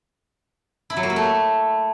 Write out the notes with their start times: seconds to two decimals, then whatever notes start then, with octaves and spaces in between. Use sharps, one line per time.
0.90 E4
0.97 F#3
1.03 A#3
1.10 E4
1.16 A3